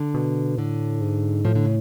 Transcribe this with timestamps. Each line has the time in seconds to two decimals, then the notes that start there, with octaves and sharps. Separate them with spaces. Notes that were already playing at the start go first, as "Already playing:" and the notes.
Already playing: D3
0.14 B2
0.58 A2 D3
1.01 G#2
1.45 A2 F3
1.55 D3
1.65 C#3